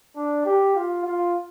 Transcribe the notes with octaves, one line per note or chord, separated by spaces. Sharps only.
D4
G4
F4
F4